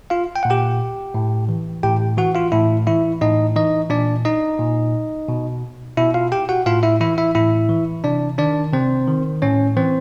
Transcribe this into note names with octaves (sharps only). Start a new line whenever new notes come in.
F4 F5
G5
A#2 F#5
G4 G5
A2
E3
A2 G4 G5
E3 F#4 F#5
F4 F5
A2 E4 E5
E3 E4 E5
A2 D#4 D#5
E3 D#4 D#5
A#2 D4 D5
D#4 D#5
A#2
B2
B2 E4 E5
F4 F5
G4 G5
F#4 F#5
A2 F4 F5
E4 E5
E3 E4 E5
E4 E5
A2 E4 E5
E3
C3 D4 D5
D#3 D4 D5
C3 C4 C5
D#3
A2 C#4 C#5
E3 C4 C5